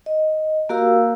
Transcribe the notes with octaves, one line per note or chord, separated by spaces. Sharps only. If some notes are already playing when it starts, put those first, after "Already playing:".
D#5
A#3 F#4 G4 A#4 F5 E6